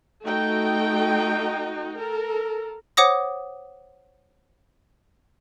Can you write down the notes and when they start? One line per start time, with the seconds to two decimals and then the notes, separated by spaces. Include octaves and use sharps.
0.25 A3 D#4 F#4 G5
1.98 A4 A#4
2.97 C5 C#5 F#5 D6 D#6 A#6